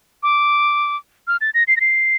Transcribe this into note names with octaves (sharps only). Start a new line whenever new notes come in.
D6
F6
A6
A#6
C7
A#6
C7